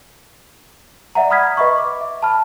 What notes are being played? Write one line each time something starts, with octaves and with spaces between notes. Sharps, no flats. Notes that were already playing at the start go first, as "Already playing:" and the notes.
D5 E5 F#5 A#5
F#5 B5 D#6 F6 G#6 B6
B4 D#5 E5 B5 C#6
D6
E5
A5 B5 F6